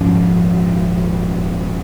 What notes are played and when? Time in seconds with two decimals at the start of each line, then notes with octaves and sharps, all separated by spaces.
0.01 D#1 G#2 F3 C#4